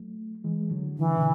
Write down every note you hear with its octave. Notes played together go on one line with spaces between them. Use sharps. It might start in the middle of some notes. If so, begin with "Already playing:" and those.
Already playing: F#3 A3
E3 G#3
D3 F#3
D3 E3
C#3
B2 D3